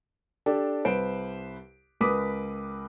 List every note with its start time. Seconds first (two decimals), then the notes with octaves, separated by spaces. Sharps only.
0.46 D4 G4 A4
0.85 C2 B4 C5 D7
2.01 C#2 A#4 B4 D6 D#6 B6